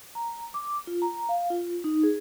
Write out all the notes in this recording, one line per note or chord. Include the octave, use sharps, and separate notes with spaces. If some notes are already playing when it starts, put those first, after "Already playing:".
A#5
D6
F4
A#5
F5
F4
D#4
G#4